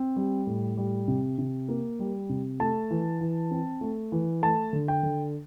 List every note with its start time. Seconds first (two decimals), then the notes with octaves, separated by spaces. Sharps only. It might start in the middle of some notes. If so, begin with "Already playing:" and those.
Already playing: C4
0.16 G3
0.47 A2
0.77 G3
1.08 C3
1.38 C3
1.69 A#3
1.99 G3
2.29 C3
2.60 A3 A5
2.90 E3
3.21 E3
3.51 C4
3.81 A3
4.12 E3
4.42 A3 A5
4.73 D3
4.88 G5
5.03 D3